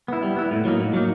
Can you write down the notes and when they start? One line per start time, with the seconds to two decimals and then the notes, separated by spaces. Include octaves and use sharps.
0.08 B3 E4
0.23 G3
0.36 B3 E4
0.51 A2
0.65 F#3 A#3 D#4
0.80 A2
0.93 F#3 A#3 D#4